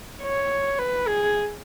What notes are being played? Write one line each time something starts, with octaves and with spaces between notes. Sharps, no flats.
C#5
B4
G#4